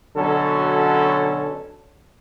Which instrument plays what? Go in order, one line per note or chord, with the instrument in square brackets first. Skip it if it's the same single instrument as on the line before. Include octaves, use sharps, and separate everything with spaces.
[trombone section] B2 D3 F#3 C#4 F#4 A4